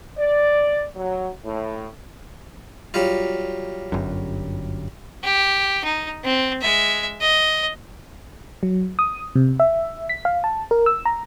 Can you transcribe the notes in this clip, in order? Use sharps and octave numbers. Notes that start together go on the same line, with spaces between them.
D5
F#3
A2
F#3 G3 F4
G1 F#2
G4
D#4
C4
G#3 E5
D#5
F#3
D#6
C3
E5
B6
F5
A5
A#4
E6
A#5